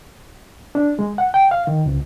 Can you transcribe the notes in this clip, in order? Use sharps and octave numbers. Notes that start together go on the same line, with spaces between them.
D4
G#3
F#5
G5
F5
D#3
C#2